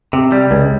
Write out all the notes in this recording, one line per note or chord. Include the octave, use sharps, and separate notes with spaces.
C3
G3
C#2